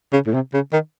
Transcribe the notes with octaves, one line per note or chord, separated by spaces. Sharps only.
C#3
A2
C3
C#3
D#3